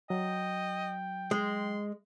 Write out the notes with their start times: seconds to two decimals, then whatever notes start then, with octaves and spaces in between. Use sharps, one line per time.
0.10 F#3 D#5 G5
1.31 G#3 C6